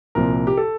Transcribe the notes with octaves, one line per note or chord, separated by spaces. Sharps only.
C2 A#2 F3 A#4
G4
A4